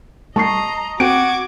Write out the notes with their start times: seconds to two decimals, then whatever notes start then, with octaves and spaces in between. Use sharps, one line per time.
0.36 G3 A3 D#5 A5 A#5 C#6 C7
1.00 C4 F#4 G5 D6 G#6 D7 D#7